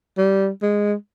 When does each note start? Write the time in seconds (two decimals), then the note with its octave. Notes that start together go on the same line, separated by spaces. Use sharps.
0.18 G3
0.62 G#3